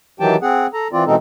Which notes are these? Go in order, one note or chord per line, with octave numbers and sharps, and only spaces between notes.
D#3 E3 F#3 G4 G5 A5
C4 G#4 F#5
A4 A#5
E3 C4 F4 D5
B2 E3 G#3 C4 D#4 A4